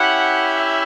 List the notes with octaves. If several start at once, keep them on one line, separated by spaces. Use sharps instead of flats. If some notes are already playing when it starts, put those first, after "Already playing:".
Already playing: C#4 E4 G4 F#5
E5